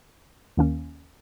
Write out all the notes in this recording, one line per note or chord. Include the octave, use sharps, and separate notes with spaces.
D#2 D#3 A#3 C#4